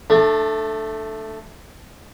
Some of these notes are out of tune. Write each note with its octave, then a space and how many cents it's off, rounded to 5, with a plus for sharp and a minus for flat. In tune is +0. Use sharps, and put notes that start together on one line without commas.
A3 +0 D4 +30